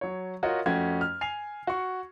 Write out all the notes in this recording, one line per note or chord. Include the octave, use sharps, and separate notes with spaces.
F#3 C#5
F4 F#4 A#4 C#5 D#5
F2 A3 C#4 F#4 G5 G#6
F6
G#5 C7 F7
F#4 C#6